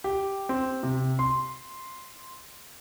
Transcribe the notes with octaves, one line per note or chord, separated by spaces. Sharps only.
G4
C4
C3
C6